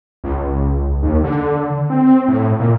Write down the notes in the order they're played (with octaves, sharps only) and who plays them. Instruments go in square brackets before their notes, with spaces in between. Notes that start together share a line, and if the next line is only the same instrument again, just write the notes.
[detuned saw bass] C#2
D#2
D3
C4
A2
A#2